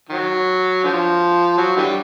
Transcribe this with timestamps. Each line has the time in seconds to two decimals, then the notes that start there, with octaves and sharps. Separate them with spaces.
0.09 D#3 F#3
0.84 D3 F3
1.57 F#3
1.76 D3 E3 G3